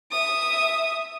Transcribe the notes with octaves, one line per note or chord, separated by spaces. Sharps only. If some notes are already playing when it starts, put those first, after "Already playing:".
E5 D#6